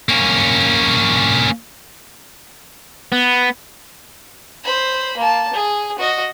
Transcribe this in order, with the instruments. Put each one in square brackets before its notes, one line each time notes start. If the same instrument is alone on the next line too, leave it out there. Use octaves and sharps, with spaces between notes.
[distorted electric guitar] A#3 C#4
[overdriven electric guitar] B3
[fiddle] C5 B5
A#3 A5
G#4
F#4 D#5